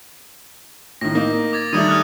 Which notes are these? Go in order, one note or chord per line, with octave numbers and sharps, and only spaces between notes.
A2 D#3 A#6
A#3 D#4
D6 G#6 A6
D#3 G3 A3 D#6 G#6 D#7
F6 F#6